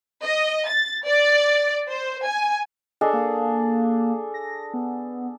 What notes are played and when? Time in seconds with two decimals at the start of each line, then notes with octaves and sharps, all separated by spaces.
0.23 D#5
0.69 A6
1.06 D5
1.89 C5
2.25 G#5
3.01 D4 G#4 A4 D#5
3.13 A#3
4.34 A#6
4.74 B3